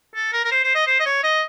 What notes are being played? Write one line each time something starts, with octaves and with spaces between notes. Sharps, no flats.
A4
A#4
A#4
C5
C5
D#5
C5
D#5
C#5
D#5